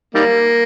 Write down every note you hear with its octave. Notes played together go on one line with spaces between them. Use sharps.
D#3 G3 A#3